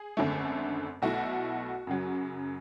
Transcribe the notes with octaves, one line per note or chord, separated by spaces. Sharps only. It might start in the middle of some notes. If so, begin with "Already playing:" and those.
Already playing: G#4
G#1 F#2 D3 A3
B1 B2 A3 E4 F#4
F#2 C#3 F#3